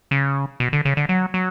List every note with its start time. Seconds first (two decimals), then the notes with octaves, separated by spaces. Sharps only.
0.11 C#3
0.60 B2
0.73 D3
0.85 C#3
0.97 D3
1.09 F#3
1.34 F#3